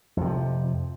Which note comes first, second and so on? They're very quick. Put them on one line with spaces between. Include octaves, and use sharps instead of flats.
F2 C3 F3